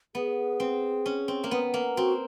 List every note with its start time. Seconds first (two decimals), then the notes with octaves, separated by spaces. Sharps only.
0.15 B3 G#4
0.60 C4
1.06 C#4
1.28 C4
1.44 A#3
1.51 B3
1.74 A#3
1.97 C4 F#4